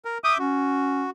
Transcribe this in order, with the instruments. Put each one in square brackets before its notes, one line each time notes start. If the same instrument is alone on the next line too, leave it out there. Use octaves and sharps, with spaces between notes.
[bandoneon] A#4
[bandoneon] E5 D6 G6 [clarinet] D#6
[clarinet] C#4 [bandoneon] F#4